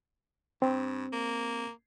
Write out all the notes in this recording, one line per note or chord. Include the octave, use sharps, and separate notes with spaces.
G2 C4
A#3